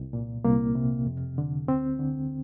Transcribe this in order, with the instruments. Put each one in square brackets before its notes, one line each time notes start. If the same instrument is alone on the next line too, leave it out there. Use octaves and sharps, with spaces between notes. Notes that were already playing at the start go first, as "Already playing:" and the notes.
Already playing: [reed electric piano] C2
A#2
C2 A#3
C3
F2
D3
D2 C4
D3